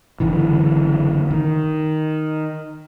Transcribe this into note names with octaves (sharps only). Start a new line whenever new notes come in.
F#1 D3 E3
D#3